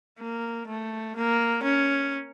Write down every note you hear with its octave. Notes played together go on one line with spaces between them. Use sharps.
A#3
A3
A#3
C#4